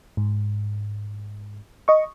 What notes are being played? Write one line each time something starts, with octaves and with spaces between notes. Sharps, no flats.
G#2
D#5 C#6